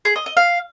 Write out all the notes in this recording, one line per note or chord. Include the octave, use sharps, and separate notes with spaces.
G#4
D#5
D#5
F5